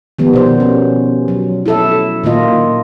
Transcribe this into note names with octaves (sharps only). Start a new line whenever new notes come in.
D#3 F3 G3 B3
B2 C5
C#4
F#3
E4 A4 E5
A#2 D#3 A#3 F4 D#5